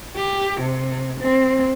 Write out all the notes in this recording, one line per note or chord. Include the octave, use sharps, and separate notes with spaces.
G4
C3
C4